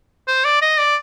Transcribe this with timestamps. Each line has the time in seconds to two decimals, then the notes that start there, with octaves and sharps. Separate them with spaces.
0.28 C5
0.45 D5
0.62 D#5
0.78 D5